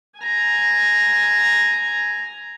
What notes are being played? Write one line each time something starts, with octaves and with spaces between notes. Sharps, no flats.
G#5 A#5